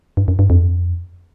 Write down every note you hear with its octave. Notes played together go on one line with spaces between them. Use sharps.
G2
F#2
G2
F2